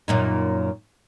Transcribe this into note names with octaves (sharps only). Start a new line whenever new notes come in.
F#2 A#2 D#4